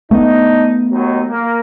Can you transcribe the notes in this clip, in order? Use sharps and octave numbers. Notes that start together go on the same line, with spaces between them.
A3 B3 D4 D#4
D#2 F#3 D#4
A#3